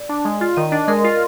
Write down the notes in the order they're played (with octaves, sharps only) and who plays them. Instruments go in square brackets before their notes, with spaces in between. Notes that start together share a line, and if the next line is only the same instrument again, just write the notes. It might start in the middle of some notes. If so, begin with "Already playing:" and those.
Already playing: [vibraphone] D5
[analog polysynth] D4
G#3
F4
[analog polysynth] D#3 [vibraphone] D#5
[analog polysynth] D4
[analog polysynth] G#3 [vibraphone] A#4
[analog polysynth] F4